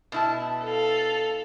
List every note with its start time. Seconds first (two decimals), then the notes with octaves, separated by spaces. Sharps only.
0.12 B2 E4 A5
0.65 A4 F5